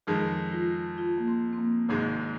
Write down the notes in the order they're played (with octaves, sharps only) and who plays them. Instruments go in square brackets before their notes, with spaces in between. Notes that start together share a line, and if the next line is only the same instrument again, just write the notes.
[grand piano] F2 D#3 G#3 [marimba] G#4
[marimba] F4
F4
A#3
C4
C4
A#3
[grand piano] G#1 G#2 G#3 [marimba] C3